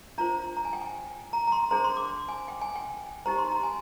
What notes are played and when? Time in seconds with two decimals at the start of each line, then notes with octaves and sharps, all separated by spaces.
0.18 D4 F4 C5 A#5
0.57 A#5
0.65 G#5
0.73 G5
0.82 G#5
1.33 A#5
1.47 A#5
1.52 C6
1.71 D4 G#4 C5 A#5
1.84 C6
1.97 D6
2.29 G#5
2.48 G5
2.62 G#5
2.76 G5
3.26 D#4 G4 C5 A#5
3.39 C6
3.51 A#5
3.63 G#5